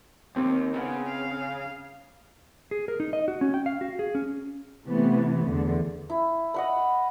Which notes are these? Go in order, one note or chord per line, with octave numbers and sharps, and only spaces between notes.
D#2 C4
C#3 B3
F5
G#4
A#4
D#4
D#5
F#4
C#4
G5
F5
F#4
G#4
C#4
C3 E3 A3 B3
E2 D3
E4
D#5 F#5 B5